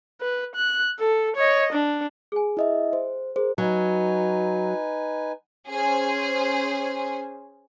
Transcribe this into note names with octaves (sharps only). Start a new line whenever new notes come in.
B4
F#6
A4
C#5 D#5
D4
G#4 G#5
E4 D#5 E5
C5
G#4 A#4 C5
F#3 D#4 B4 G#5
C#4 G#4 C5